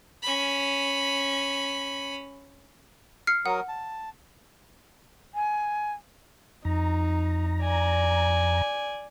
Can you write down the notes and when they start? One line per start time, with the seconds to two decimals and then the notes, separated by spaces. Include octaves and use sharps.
0.22 C#4 B5
3.27 F6 C7 C#7
3.46 F#3 A#4 F#5 D#6
3.68 A5
5.35 G#5
6.65 F2 D#4 A#5
7.61 D5 G#5